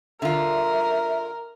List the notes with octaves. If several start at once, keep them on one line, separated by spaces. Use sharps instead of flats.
D3 F4 A#4 E5